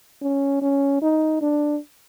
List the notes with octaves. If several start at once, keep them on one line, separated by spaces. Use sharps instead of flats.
C#4
C#4
D#4
D4